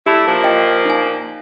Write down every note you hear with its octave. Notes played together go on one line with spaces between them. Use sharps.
A3 D4 E4 G4 B5
A#2 F3 A#3
D#5 G5
D#4 G#5